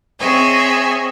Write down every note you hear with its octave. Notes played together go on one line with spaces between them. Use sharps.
C4 G#4 C#5 D#5 E5 G#5